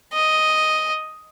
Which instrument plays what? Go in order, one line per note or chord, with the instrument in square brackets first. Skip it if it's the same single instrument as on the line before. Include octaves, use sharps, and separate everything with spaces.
[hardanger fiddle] D#5